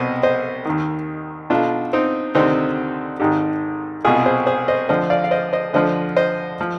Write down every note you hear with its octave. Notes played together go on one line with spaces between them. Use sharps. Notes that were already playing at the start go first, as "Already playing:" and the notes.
Already playing: C2 B2 C5 D#5
C5 D#5
D#2 D#3
B1 B2 D4 F4
C4 D#4
D2 C3 D#3 C4 D#4
G#1 G#2 D#3 D#4 G4
C2 B2 F4 G#4
G#4 C5
G#4 C5
C5 D#5
D2 D3 F3 C5 D#5
D5 F5
F5
C5 D#5
C5 D#5
D2 D3 F3 C5 D#5
C5 D#5
F3